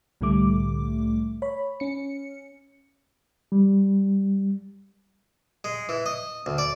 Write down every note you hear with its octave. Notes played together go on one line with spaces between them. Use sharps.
C2 A2 D3 G3 A3 D6
C#5 B5
C#4 C#7
G3
G#3
E3
D#5
D2
D5